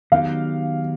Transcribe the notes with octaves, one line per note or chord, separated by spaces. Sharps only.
D#3 F#3 B3 D#4 G4 F5